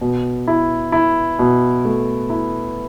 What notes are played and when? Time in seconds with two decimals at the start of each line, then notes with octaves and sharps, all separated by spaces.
0.01 B2
0.48 E4
0.92 E4
1.39 B2
1.85 A3
2.30 E4